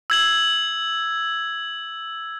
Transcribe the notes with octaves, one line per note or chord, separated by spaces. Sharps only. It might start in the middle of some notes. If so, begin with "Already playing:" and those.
E6 G#6 F#7